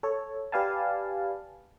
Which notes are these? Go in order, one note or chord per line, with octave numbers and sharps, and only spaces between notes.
A4 C#5
G4 B4 D5 F5 G#5 A5